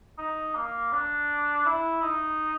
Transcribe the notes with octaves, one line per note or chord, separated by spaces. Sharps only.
D#4
A#3
D4
E4
D#4